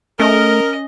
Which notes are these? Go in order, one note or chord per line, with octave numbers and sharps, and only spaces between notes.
A3 C#4 A#4 D#5